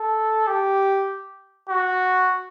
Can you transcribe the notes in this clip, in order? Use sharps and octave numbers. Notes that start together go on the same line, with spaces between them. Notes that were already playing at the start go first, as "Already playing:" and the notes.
Already playing: A4
G4
F#4